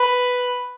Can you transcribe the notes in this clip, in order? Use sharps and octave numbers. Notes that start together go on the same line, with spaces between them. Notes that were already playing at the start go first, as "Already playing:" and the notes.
Already playing: B4